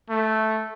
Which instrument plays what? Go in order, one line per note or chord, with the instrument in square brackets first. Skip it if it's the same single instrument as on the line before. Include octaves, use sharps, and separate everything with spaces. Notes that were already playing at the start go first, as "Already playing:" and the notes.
[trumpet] A3